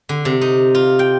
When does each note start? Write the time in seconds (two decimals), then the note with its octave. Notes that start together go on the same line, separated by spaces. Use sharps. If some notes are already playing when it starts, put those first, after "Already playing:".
0.09 D3
0.25 C3
0.41 D#4
0.75 F4
0.99 G5